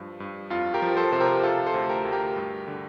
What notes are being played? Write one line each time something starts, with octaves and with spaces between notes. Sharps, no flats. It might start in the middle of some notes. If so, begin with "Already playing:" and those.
Already playing: G2 F3
G2
F2 F4
G4 A#4
F3
A4 C5
C3 C5
G4 A#4
C3 F4 A4
A4 C5
D2
G4 A#4
D2
G4 A#4
G2
D3